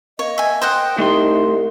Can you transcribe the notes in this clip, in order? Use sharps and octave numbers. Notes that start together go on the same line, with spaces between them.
A#3 C#5 D#5
E5 G#5
C5 D#5 F#5 G5
C2 A3 D#4 C6